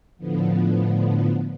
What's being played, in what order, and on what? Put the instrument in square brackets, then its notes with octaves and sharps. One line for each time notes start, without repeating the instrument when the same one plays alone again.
[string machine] A2 D3 F3 B3